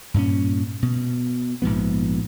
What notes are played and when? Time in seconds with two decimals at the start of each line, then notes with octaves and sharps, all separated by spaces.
0.14 G2 A#2 A#3 C#4
0.82 B2
1.62 A#1 G#2 F3 B3